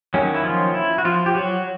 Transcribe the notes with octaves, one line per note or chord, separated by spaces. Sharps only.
D#3 F#3 A#3 C#4
E4
F3 F4
E4
F#4
F3 F4
G4
F#3 F#4